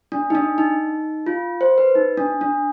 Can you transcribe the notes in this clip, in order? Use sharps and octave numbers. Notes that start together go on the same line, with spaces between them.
D4
D#4
D4
D#4
F4
C5
B4
D#4
D4
D4